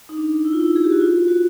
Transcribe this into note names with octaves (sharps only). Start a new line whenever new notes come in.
D#4
D4
E4
F4
E4
G#4
G4
F#4
F4
F#4